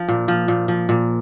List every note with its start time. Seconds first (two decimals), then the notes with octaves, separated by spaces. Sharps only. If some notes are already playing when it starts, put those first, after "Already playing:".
Already playing: F3
0.09 A#2
0.28 F3
0.48 A#2
0.68 F3
0.89 A#2